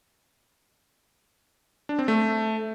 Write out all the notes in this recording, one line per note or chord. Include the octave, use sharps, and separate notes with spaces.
D4
C4
A3